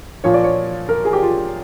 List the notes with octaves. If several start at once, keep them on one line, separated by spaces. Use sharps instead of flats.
A#2 F3 C#5
D5
C#5
A#4
G#4
G4
F4